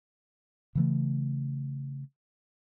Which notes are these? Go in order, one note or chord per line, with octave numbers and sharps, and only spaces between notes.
C#3 E3 A3